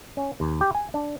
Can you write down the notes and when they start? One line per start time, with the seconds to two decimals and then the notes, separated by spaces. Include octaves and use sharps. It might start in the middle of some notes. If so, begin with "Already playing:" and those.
0.17 C#4
0.40 D#2
0.61 G4
0.75 G#5
0.94 D4